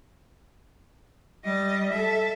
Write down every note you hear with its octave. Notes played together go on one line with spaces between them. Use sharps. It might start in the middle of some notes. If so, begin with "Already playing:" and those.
G3 D#5
A4 E5